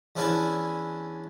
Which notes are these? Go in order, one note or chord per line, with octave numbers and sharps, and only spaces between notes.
E2 C#4 D4 E4 B4 G#5